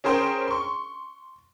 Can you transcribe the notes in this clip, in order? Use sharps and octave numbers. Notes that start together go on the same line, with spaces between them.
C#4 G#4 A#4 C5 G5
C6 C#6